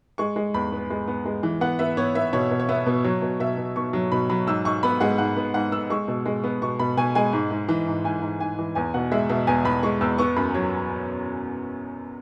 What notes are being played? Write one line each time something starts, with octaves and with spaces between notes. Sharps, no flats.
G#3 C#6
G#3
E2 B5
B3
G#3
B3
G#3
E3
B3 F#5
B3 E5
B3 C#5
B3 E5
B2 C#5
B2
C#5
B3 E5
B2
F#3 C#5
B2
B2 E5
B2
B2 C#6
F#3
B2 B5
F#3 B5
G#2 E6
G#2 C#6
B3 B5
G#3 F#5
G#2 F#5
B3
G#2 F#5
B3 E6
G#3 C#6
B2
G#3
B3
B2 C#6
B2 B5
B2 G#5
G#3 G#5
G#2
G#2
E3
G#2
G#2 G#5
G#2
G#2 G#5
E3
E2 G#5
B2 F#5
G#3 E5
B2 E5
E2 G#5
E2 B5
G#3 C#6
E2 E6
B3 C#6
F#2 B5
F#3 C#5